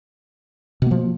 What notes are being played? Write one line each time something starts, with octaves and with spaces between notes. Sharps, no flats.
B2 F3 A#3